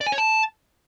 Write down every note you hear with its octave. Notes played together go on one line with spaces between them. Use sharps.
D5
G#5
C#5
A5